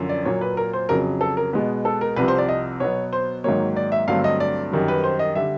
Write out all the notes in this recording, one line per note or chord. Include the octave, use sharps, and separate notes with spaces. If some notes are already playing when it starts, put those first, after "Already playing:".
Already playing: F#2 D3 F3 C#4
D5
A#2 F#3 A#3 C#5
B4
A#4
C5
F2 C#3 F#3 A#4
A4
A#4
B2 G#3 B3
A4
A#4
C2 C3 F3 B4
C5
D5
D#5
B2 F#3 B3 C#5
C5
G#2 D#3 F#3 A#3 C#5
D5
E5
G2 D3 F#3 A3 C4 F5
D#5
D5
F#2 D#3 G3
B4
C5
D#5
D3 G3 E5